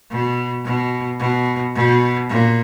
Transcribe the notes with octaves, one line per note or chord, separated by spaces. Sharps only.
B2
B2
B2
B2
A#2